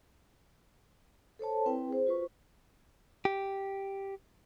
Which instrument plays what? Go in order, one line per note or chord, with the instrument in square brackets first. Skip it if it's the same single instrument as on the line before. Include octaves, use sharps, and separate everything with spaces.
[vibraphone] A4 C5 C#5 A5
C4 E4 B4 G5
G#4 C5
F4 F#4 B4 C5 C#6
[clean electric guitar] G4